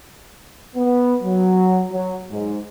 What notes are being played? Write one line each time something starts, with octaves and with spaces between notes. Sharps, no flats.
B3
F#3
F#3
G#2